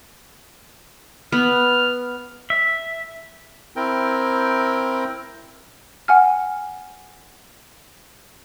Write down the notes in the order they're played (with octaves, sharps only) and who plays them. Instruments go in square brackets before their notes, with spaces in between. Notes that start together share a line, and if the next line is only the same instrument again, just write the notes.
[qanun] B3 [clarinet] F6
[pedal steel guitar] E5
[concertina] C4 E4 A#4 G5
[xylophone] F#5 G#5 F6